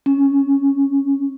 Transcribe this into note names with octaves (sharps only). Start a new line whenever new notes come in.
C#4